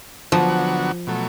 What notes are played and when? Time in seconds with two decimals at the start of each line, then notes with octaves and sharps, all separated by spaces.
0.32 D3 F3 F#3 B3 F#4
1.07 B2 F#3 A3